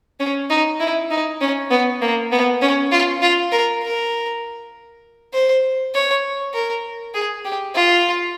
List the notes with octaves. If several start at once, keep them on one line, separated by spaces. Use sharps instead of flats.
C#4
D#4
E4
D#4
C#4
B3
A#3
B3
C#4
F4
F4
A#4
A#4
C5
C#5
A#4
G#4
G4
F4